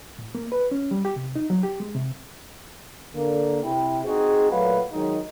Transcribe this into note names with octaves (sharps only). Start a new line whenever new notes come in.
A2
A#3
B4
C#4
G3
G4
C3
D#4
F#3
G4
G#3
C3
D3 A#3
C3 E4 G5
C4 D#4 F#4 G#4
A#2 F#3 A3 B4 F5 F#5
D#3 F#3 G#3 D#4